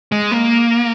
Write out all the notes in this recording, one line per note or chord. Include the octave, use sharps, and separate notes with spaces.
G#3
A#3